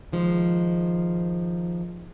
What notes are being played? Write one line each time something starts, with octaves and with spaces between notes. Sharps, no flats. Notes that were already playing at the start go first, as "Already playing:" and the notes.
D#3 F3 G#3